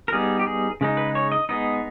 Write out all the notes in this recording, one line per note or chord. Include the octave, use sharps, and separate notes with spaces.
A#4
G3 B3 D#4 G#4
G4
G#4
C#3 G#3 D#4
B4
C#5
D#5
G#3 B3 D#4 D#5